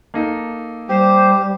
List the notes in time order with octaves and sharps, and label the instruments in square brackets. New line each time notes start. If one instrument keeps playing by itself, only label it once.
[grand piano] A#3 D#4 A4
[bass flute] G3 [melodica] G4 [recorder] C5